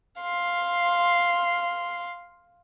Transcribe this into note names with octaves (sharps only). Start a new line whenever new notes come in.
F5 C6